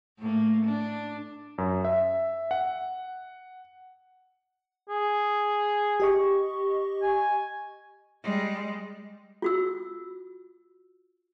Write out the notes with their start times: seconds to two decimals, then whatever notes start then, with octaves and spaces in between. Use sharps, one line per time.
0.19 A2 A3 A#3
0.65 D4
1.58 F#2
1.85 E5
2.51 F#5
4.89 G#4
6.00 G4 D#5 C#6
7.02 G#5
8.23 G3 G#3
9.42 F4 F#4 E6